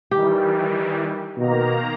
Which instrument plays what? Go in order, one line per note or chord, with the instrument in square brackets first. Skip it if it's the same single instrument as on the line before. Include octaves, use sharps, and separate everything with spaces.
[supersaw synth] D#3 E3 G3 [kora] G4
[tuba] B2 [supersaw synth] D#3 A#3 A#5